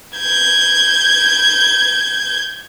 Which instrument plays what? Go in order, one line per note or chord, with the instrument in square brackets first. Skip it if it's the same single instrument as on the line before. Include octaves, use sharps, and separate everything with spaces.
[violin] G6 G#6